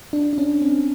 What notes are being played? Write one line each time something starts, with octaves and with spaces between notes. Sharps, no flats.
D4
D4
C#4
C4